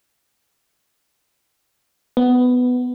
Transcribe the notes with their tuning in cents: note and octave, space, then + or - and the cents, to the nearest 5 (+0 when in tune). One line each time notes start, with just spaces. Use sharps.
B3 +10